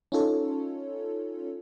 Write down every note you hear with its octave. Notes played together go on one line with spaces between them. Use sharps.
C#4 D#4 F4 A4 C#5